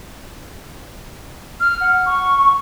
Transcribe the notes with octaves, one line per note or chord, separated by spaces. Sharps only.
F6
F#5
C#6